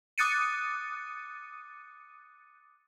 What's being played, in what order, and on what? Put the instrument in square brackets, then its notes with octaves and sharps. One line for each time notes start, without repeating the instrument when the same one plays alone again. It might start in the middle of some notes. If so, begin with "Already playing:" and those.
[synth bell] D6 D#6 F#6 A6 C#7 D#7